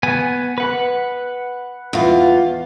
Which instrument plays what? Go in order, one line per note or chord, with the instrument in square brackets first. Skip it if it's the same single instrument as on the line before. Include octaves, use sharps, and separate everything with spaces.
[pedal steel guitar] B3 G#5
B4 F#5
[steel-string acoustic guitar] E2 F4